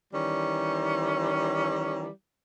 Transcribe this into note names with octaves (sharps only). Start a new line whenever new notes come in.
D#3 E3 G3 C#4